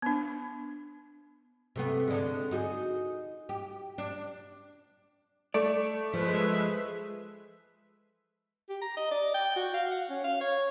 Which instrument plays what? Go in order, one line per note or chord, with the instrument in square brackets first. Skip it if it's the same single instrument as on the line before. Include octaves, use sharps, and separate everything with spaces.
[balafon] B3 D4
[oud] C3 A3 B3
D3 G#3
D#4 F#4 G#4
G4
D4
[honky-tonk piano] A3 [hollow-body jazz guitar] D5
[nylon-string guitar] F3 [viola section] G#3 B4 E5
[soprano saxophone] G4
A#5
D#5
D5
G5
F#4
F5
F#5
C#4
F5
C#5